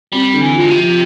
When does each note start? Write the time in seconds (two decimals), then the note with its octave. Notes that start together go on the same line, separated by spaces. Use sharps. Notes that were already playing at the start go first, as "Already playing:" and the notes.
0.12 G3 C4
0.34 D3
0.41 E3
0.55 F4
0.60 B2
0.70 C3
0.77 F3